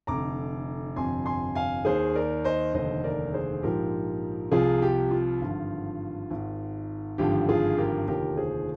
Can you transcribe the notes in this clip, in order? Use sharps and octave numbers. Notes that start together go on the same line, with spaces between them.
F1 F2 D3 A#5 D6
G1 F2 C3 G#5 C6
G#5 C6
F5 G#5
D#2 D#3 G#4 C5
A#4 D5
C5 D#5
F1 D#2 D3 C5 D#5
A#4 D5
G#4 C5
A#1 G#2 F3 G4 A#4
C2 C3 F3 F4 G#4
G4
F4
G#1 G2 D3 F3
G#1 G#2 D#3
G#1 G2 D3 F3 G4
F4 G#4
G4 A#4
F1 D#2 D3 F3 G4 A#4
G#4 C5